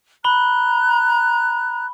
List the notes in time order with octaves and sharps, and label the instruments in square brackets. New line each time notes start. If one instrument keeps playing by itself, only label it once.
[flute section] A#5 F#6 [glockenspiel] B5 G7